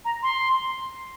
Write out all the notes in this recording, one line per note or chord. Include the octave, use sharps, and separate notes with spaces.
A#5
C6